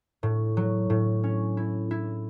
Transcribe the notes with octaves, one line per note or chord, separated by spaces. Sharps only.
A2
F#3
A2
C#4
E4
E4